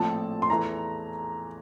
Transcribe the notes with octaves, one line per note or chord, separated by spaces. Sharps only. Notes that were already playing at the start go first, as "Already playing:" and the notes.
Already playing: A#1 A2 F3 A3 C4 A5
C6
E2 E3 A3 A#5